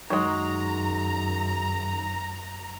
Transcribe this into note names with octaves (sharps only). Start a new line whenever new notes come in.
F#2 D#3 F#3 G#3 A#5